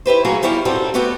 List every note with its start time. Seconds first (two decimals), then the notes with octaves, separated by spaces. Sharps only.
0.06 E4 G4 B4 C5
0.25 F#3 A3 A#3 F4 F#4 G#4
0.42 E2 G3 E4 G4 C#5 F5
0.65 F#2 A2 F#3 G3 C4 A4
0.94 A3 B3 F#4 G4 A4